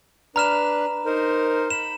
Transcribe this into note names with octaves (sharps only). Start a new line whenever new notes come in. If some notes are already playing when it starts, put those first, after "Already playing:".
D4 B4 A#5 F6 E7
D#4 A#4 C5
B5 E7